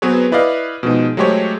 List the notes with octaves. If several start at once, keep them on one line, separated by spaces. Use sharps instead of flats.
F#3 B3 C4 G#4 B4 C#5
E4 B4 D5 D#5 F5
B2 F3 G#3 D#4
F#3 G#3 A3 G4 C5 C#5